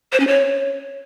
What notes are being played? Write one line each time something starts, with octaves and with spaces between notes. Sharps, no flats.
C5
C#4
C#5